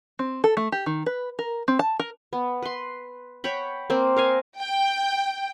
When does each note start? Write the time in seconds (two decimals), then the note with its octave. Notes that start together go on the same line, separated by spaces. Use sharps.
0.19 C4
0.44 A4
0.57 A3
0.72 G4
0.86 D#3
1.06 B4
1.39 A#4
1.68 C4
1.79 A5
2.00 A#4
2.33 B3
2.62 B4 C6
3.44 C#5 F#5 G5 B5
3.90 A#3 C4
4.16 A#4 F5 G#5
4.58 G5